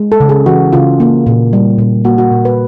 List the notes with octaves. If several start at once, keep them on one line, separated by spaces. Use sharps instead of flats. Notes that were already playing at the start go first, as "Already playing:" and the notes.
Already playing: G#3
A4
C#3
G#4
E3 F#4
C#3 F4
A#3
A#2
G3
A#2
A#3 F#4
F#4
A#2
B4